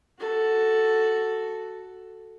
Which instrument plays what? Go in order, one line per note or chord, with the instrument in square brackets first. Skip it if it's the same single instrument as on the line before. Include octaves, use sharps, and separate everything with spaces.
[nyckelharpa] F#4 A4